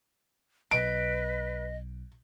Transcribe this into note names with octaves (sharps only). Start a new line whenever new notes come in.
B1 B4 D#5 D7